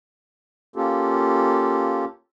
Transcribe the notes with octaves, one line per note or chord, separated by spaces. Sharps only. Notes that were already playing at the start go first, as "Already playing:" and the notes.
A#3 C#4 F4 G4 A4